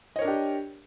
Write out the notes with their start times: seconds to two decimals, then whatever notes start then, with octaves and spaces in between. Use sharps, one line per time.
0.16 D#5
0.19 C#5
0.22 A#4
0.25 D4
0.27 G4